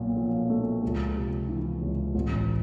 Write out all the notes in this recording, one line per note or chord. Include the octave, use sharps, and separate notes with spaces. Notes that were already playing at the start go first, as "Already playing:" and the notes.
Already playing: B1 A#2
F3
A3
C#2
C3
E3
C#2
A1